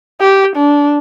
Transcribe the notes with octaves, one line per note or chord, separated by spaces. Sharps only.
G4
D4